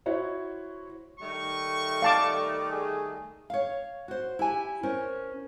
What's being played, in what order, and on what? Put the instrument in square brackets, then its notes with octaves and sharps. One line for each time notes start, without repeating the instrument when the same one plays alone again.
[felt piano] E4 F#4 C5 C#5
[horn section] D#3 G3 A3 [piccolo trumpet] C#6
[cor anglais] D5 [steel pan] F5 A5 D6
[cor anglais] G#4
[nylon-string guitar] C#5 F5
F#4 C5
E4 G4 G#5
C#4 A#4 C5